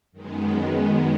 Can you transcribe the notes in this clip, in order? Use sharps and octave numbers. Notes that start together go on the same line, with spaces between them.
F#2 D#3 G#3 B3